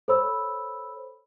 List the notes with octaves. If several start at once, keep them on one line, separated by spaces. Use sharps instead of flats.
A4 C5 C#5 B5 E6